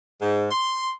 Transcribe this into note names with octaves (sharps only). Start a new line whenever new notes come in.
G#2
C6